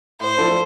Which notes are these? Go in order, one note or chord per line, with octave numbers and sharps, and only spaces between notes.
A2 C5
F3 A3 D4 A4